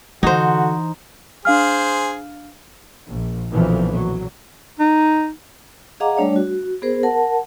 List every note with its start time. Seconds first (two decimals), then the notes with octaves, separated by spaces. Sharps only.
0.23 D3 E3 D#4 F#4 C5
1.45 D4 G#4 C5 F5 F6
3.07 A#1
3.51 B1 F2 A#2 D3 E3 F3
3.91 F#3
4.80 D#4
6.00 G#4 D#5 F5 F#5 A#5 D6
6.17 G3 A3 D4 C#5 D5
6.36 F#4
6.82 B3 G#4 A#4 C5
7.03 A#4 F#5 A5